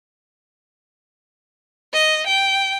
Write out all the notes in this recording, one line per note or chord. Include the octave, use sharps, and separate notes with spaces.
D#5
G5